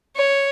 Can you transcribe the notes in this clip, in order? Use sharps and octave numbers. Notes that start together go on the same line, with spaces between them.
C#5